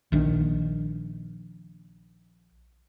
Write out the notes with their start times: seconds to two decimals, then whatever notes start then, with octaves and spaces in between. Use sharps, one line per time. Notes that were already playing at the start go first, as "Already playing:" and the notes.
0.12 A#1 D#3 D4